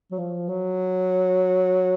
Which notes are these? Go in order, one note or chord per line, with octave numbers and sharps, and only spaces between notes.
F#3
F3
F#3